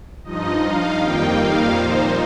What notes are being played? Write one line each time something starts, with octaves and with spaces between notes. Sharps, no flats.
G2 F3 D#4 D#5
F5
F2 D#3 G3 A#3 D#4 G5
F5
A#2 F3 D#4 C5